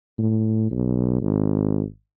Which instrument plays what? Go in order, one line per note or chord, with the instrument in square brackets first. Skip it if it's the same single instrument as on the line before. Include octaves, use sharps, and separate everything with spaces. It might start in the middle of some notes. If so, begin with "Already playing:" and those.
[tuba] A2
B1
G#1